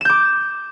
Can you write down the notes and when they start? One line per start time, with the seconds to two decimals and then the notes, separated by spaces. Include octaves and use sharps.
0.01 E7
0.05 G6
0.09 D6